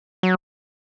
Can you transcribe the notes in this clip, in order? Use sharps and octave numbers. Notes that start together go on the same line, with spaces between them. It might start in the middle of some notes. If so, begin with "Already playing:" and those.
F#3